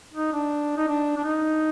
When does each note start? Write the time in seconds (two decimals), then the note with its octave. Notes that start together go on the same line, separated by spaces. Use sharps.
0.14 D#4
0.33 D4
0.77 D#4
0.88 D4
1.17 D4
1.24 D#4